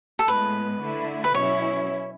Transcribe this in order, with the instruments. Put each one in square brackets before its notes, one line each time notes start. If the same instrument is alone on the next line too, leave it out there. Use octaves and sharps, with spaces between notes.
[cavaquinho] A4
[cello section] A2 G#3 B3 [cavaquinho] B4
[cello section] D3 A3 E4
[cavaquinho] B4
[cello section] B2 F#3 C#4 E4 [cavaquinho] C#5